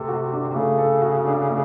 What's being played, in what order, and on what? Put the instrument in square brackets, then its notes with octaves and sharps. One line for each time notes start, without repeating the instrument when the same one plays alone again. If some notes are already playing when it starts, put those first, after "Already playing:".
Already playing: [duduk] C3 [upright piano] A3 A4
[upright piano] F#4
D4
[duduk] C3
[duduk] C#3 [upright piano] A3
[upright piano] A4
F#4
D4
A3